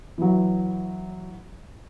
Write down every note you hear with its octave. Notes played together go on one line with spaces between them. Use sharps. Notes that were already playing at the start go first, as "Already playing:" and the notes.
E3 F#3